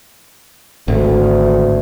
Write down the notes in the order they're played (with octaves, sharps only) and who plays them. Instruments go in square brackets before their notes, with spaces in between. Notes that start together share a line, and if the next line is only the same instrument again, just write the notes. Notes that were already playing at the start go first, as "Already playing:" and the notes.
[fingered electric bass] G#1 [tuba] D2